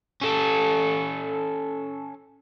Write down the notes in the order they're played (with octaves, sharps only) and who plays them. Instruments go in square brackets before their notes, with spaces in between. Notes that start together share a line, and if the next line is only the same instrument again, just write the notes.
[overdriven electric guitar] C#4 A4